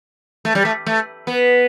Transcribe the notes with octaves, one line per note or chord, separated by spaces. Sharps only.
A3
G3
A3
A3
B3